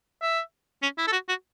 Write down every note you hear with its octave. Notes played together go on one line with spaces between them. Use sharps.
E5
C#4
E4
A4
F#4
F#4